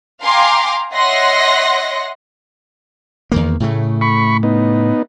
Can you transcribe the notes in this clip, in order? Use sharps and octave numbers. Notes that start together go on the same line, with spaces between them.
F5 G5 G#5 A#5 C6 D6
C#5 D#5 E5 F#5 C6 A#6
E2 D#3 A#3
A2 C#3 A3
B5 C#6
B3 D#4